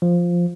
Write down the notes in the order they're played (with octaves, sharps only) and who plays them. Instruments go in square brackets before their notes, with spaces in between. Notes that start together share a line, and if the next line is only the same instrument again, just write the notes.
[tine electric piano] F3